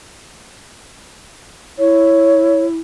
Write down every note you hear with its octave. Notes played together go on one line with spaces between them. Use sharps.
E4 C#5